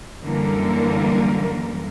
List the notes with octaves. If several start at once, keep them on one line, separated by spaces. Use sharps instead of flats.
F#2 D3 E3 G3 A#3 A#4